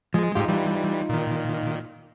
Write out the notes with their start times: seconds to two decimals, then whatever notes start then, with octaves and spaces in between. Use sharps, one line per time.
0.14 F3 G#3
0.35 G#2 G#3 D#4 F4 G4
0.48 E3 G3
1.09 A#2 D#3